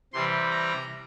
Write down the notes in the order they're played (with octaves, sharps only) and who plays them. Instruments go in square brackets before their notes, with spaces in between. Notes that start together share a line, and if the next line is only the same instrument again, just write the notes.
[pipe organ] C3 E3 G3 C6
A#5